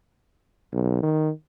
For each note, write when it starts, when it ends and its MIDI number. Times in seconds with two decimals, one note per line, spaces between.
0.73 1.01 35
1.03 1.30 51